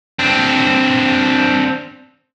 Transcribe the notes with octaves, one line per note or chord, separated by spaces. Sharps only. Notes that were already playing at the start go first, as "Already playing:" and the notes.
C4 D4